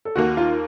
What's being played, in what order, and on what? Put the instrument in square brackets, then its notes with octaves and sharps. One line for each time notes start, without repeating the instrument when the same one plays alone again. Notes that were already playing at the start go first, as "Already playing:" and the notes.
[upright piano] A4
[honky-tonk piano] D#2 D#3 A#3 [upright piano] F#4
[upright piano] F4